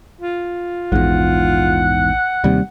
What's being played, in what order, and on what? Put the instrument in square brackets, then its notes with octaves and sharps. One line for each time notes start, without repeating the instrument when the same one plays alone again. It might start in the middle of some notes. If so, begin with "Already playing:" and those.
[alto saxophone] F4
[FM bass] A#1 [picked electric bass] E2 G#2 [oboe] F#5
[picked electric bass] D#2 C3 [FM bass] G3